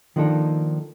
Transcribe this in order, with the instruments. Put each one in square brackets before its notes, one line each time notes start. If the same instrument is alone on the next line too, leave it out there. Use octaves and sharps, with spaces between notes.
[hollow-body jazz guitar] D#3 F3 A#3 D4 D#4 A4